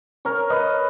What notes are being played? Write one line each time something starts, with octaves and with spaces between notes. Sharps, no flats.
A#4 C#5
B4 D#5